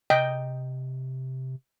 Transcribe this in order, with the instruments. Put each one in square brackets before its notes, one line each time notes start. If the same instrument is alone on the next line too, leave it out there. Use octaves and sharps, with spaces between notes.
[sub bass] C3 [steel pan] D#5 G5